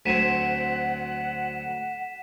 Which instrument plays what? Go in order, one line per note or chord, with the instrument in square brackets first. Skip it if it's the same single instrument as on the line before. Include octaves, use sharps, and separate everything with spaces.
[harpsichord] D2 F#3 C4 [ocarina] F#5 [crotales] B6 D#7 E7